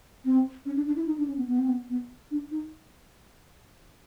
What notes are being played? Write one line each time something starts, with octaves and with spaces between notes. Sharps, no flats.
C4
C#4
D4
D4
E4
D#4
D4
C#4
B3
B3
C4
B3
B3
D4
D#4